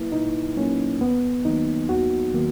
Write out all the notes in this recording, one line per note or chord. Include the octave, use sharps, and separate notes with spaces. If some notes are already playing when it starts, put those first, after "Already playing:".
Already playing: A#2 F#3 A#3 E4 B4
A#2 D#4
F#3 A#3 C#4
D#2 B3
D#3 F#3 A#3 D#4
D#2 F#4
D#3 F#3 A#3